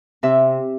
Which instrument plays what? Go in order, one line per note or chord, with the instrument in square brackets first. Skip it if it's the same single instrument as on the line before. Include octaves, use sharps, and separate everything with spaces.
[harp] C3 E5